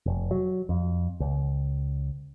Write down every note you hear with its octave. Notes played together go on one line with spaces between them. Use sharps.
F1
F#3
F2
C#2